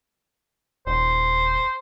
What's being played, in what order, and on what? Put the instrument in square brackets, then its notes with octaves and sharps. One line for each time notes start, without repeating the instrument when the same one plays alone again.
[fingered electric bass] D#1 [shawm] C5